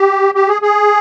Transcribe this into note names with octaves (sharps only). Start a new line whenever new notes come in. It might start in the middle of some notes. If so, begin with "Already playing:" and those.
Already playing: G4
G4
G#4
G#4